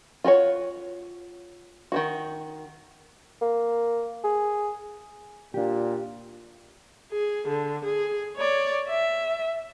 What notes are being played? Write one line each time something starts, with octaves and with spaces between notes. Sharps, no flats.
F4 F#4 G#4 C#5
D#3 E3 F#4
A#3
G#4
A#2 D4 G4
G#4
D3
G#4
C#5 D5
E5